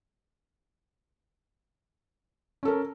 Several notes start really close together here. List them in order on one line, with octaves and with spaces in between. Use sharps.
C#4 A4 A#4